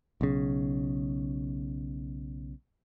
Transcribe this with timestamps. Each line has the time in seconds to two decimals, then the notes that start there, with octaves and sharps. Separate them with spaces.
0.21 B1 C#3